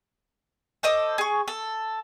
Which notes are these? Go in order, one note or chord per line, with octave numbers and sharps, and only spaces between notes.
A4 C5 D#5 D6
G#4 C#6
A4